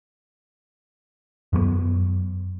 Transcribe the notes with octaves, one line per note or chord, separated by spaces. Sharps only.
F#2 F#3 G3 B3